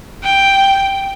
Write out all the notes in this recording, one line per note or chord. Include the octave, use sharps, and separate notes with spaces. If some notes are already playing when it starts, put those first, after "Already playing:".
G5